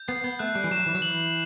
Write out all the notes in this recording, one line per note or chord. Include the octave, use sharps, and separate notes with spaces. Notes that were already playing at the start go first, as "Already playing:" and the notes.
Already playing: G6
B3 C7
B3
A3 F#6
G3
E3
F#3 E7
E3
F#3
E3 F#7